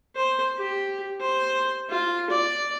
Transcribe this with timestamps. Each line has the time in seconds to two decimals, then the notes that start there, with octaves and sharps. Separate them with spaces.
0.16 C5
0.58 G4
1.20 C5
1.89 F4
2.30 D5